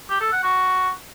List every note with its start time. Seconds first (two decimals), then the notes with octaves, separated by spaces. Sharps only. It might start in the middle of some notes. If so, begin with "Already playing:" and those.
0.10 G4
0.21 A4
0.32 F#5
0.43 F#4